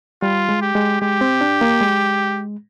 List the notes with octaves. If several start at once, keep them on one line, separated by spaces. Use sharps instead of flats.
G3 F4
G#3
G4
G#3
G#3 G4
C4
D4
A#3
G#3